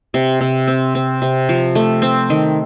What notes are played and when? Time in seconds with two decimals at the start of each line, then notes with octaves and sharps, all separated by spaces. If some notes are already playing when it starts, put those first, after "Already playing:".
0.14 C3
0.41 C3
0.67 C4
0.95 C4
1.22 C3
1.49 F3
1.75 A3
2.02 C4
2.30 D#3